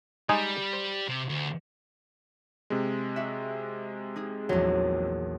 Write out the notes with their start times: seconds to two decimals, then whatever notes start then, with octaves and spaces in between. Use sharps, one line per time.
0.29 G3 G#3 D#4 G#4
0.73 C5
1.08 C3
1.29 D2
2.70 C3 G#3
3.16 F#4 E5
4.16 D#4 G#4
4.49 A#1 E2 F#3